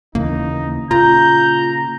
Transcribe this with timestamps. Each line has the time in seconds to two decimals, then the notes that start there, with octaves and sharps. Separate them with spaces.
0.15 D#2 C#3 E3 A#3 D#4
0.91 A#2 C#3 F4 A#5 G6